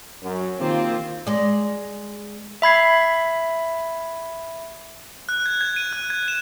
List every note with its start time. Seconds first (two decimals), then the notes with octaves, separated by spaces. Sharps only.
0.21 F#2
0.58 D#3 A#3 C4 F4 G4
1.27 G#3 D5
2.62 E5 B5 G#6 C7
5.29 F#6
5.46 G#6
5.61 G#6
5.76 D#7
5.93 F#6
6.10 G#6
6.28 E7